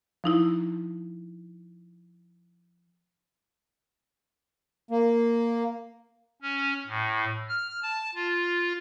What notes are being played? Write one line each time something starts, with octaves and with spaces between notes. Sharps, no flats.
F3 D#4 E4
A#3
C#4
A2
F6
A5
F4